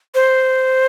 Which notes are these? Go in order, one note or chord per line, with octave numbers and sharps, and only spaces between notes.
C5